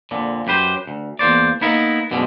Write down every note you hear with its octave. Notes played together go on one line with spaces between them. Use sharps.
F2 A#2 D3
F#2 G4 B4 C5
D2
E2 A#3 C5 D5
A#3 B3 D#4 E4 A#4 F5
F#2 B2 D3 F3 G#3